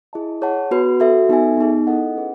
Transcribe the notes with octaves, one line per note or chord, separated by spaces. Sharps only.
E4 G#4 D#5 A5
G#4 C#5 F#5 A5
B3 F#4 B4
F#4 A4 E5
B3 D#4 A4 E5 G#5
B3 D#4 G#4
E4 A4 D#5 F#5
C#4 G#4 B4 F#5